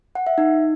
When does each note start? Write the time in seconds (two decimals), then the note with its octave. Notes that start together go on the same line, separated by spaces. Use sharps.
0.15 F#5
0.27 E5
0.38 D#4